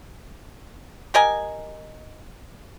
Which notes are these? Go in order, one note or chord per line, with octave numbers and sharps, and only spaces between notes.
G4 A#4 D#5 G#5